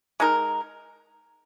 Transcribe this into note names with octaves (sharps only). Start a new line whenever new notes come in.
G#3 D#4 A#4